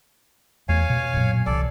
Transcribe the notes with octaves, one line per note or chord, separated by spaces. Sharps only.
E2 A3 C#5 F5 G#5
B2
F#2 A#2
C2 E3 A4 D5